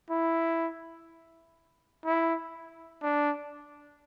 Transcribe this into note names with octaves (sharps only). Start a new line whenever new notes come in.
E4
E4
D4